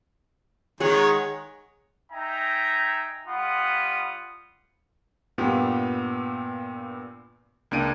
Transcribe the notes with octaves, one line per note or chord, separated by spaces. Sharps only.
D#3 G#3 G#4 C#5 F#5
D#4 E5 G5 G#5 A#5
G3 F4 F#5 B5 D#6
G2 A#2 B3 F4 G4
C#2 A#3 D4 D7 D#7